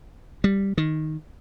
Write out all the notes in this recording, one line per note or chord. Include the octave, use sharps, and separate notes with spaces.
G3
D#3